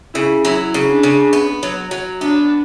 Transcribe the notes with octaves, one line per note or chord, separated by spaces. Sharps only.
C#3 E4
F#3 E4
C#3
D4
C#3
B3
F#3
F#3
B3 D4